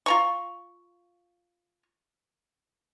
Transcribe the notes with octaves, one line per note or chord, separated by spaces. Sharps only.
F4 A#5 C#6